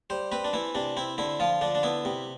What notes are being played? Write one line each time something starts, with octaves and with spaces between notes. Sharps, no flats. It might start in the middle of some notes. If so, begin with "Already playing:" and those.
G3 C5
C4 B4
D4
E3 E4
C3 D4
C4 E4
D3 E4
F3 F4
D3 D4
D4
B3 E4
C3